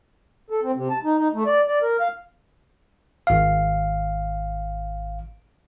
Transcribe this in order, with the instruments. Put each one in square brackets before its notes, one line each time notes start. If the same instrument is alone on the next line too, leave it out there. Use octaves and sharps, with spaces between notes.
[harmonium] A4
C4
C3
A5
D#4
D#4
A3
D5
D5
A#4
F5
[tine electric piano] G#1 F5